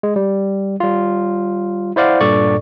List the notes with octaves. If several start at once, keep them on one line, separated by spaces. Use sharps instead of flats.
G#3
G3
G3 F4
E4 C5 D5 F5 F#5
G2 A#2 A4 D5 C#6